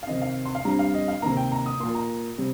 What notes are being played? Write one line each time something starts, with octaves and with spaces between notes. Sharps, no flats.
F5
C3 D#3 C4 D#5
F5
C6
F5
G2 G3 C4 A#5
F5
D#5
F5
C3 D#3 A#3 A#5
G5
A#5
D#6
A#2 A#3 C6
A#5
C3 G3 C4